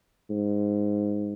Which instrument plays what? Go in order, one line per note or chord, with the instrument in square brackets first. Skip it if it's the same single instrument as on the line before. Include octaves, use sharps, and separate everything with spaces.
[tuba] G#2